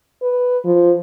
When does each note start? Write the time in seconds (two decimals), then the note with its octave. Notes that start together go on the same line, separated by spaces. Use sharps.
0.22 B4
0.65 F3